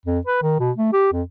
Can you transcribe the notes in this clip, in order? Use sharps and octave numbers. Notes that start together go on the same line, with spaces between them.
F2
B4
D#3
B2
A3
G4
F2